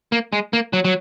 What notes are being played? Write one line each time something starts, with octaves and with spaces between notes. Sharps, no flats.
A#3
G#3
A#3
F#3
F#3